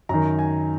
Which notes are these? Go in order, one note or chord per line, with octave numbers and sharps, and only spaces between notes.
F#2 D#3 A#5
G#5